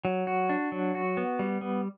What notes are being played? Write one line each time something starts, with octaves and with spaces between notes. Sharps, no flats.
F#3
F#4
D4
F#3
F#4
B3
G3
B3